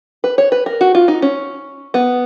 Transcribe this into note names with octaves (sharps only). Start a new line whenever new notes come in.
B4
C#5
B4
A#4
F#4
F4
D#4
C#4
B3